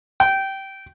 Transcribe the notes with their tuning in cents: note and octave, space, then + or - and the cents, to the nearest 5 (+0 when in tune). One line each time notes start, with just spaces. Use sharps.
G5 -15